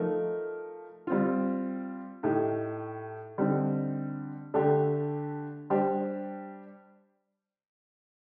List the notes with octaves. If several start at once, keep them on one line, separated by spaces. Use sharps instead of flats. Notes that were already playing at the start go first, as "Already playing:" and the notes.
Already playing: F3 A3 D#4 A#4
G3 C4 F4
A2 A3 D#4 G4
D3 G3 C4 D#4
D3 A3 D4 G4
G3 D4 G4 C5